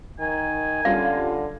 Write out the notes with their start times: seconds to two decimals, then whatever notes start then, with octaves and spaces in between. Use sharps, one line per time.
0.20 D#3 G#5
0.85 D3 G3 C#4 F4 F5